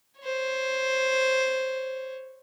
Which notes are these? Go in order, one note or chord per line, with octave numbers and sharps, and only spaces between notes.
C5 C#5